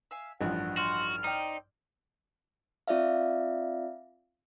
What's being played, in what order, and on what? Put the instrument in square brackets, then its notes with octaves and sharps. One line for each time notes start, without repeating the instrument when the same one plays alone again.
[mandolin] E5 F5 G#5
[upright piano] A1 G2 F3 [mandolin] A#4 F#6 [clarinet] F#5
[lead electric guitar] F#4 [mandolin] C6 G6 [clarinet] F6
[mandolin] C4 D5 G5 [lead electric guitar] D#4
[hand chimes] C4 F4 D5 E5 F5